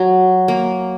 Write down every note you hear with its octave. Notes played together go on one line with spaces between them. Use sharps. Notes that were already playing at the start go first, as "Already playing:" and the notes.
Already playing: F#3
A#3